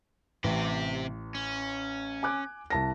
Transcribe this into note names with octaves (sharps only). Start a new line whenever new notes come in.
A1 C3 G4
C#4
G#5 D6 F#6
C2 A5 A#6